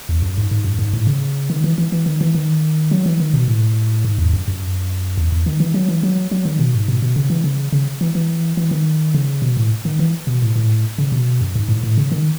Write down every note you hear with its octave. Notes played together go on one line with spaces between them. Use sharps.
E2
F#2
G#2
G#2
F#2
G#2
A2
C#3
D#3
E3
E3
E3
D#3
E3
D#3
F#3
E3
D#3
B2
A2
G#2
E2
F#2
F#2
E2
E2
D#3
E3
F#3
E3
F#3
F#3
D#3
B2
G#2
B2
B2
C#3
E3
C#3
C#3
E3
E3
E3
D#3
C#3
B2
A2
D#3
E3
B2
A2
A2
C#3
B2
F#2
G#2
A2
A2
C#3
D#3